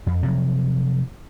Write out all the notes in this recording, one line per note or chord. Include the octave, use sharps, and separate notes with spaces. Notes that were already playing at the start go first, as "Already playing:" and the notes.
F2
C3 F3 F#3